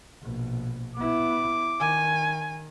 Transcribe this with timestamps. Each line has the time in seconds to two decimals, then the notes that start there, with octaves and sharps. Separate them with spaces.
0.22 A#1 B2
0.96 B3 E4 D6
1.80 D#3 G#5